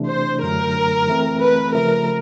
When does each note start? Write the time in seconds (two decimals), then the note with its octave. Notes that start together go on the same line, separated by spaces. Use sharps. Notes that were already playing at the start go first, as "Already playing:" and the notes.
Already playing: C3 E3 A3 D4
0.09 C5
0.42 F#2 D3 F#3 A3 A#4
1.08 E3 A3 C4
1.41 B4
1.74 C#3 F3 A3 A#4